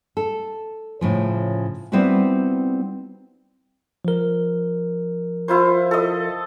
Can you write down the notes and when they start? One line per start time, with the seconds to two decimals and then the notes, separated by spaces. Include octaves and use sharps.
0.17 A4
1.01 A2 C#3 F3
1.92 G3 B3 C4 D#4 E4 F#4
4.05 F3 A#4
5.48 E4 F4 C5
5.91 A4 D#5